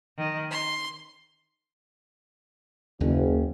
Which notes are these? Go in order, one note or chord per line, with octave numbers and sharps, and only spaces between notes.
D#3
C6
F#1 D#2 C#4